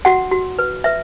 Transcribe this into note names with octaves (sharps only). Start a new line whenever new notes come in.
F#4 F#5
F#4
B4
B4 E5